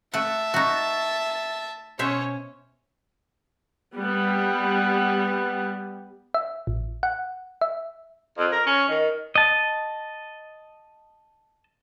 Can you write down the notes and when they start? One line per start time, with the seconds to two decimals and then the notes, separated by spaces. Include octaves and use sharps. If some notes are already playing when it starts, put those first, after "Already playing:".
0.14 A3 A4 E5 F#5 A5
0.54 D#4 F#4
1.99 B2 C#4 C5 C#5 E5
3.95 G3 B3
6.34 E5
6.67 A1
7.03 F#5
7.61 E5
8.37 F2
8.51 A#4
8.66 C#4
8.88 D#3
9.36 D#5 A5